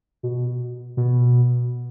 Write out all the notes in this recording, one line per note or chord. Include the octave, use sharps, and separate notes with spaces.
B2
B2